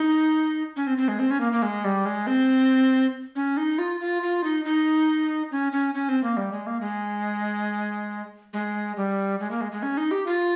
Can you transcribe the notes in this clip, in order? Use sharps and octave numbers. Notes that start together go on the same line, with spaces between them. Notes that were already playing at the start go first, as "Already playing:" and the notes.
Already playing: D#4
C#4
C4
C4
G#3
C4
C#4
A#3
A#3
G#3
G3
G#3
C4
C#4
D#4
F4
F4
F4
D#4
D#4
C#4
C#4
C#4
C4
A#3
G3
G#3
A#3
G#3
G#3
G3
G#3
A#3
G#3
G#3
C#4
D#4
G4
F4